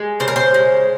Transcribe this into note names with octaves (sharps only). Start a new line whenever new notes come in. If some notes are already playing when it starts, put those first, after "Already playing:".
Already playing: G#3
C#3 C5
A#4
C5
G#3